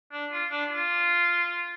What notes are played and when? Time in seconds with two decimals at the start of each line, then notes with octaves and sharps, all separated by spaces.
0.12 D4
0.32 F4
0.51 D4
0.70 F4